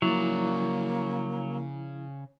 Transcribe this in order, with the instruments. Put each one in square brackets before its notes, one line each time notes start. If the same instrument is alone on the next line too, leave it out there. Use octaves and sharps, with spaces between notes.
[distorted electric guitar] C#3 D5 [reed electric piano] F3 E4 [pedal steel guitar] F#3 [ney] A#3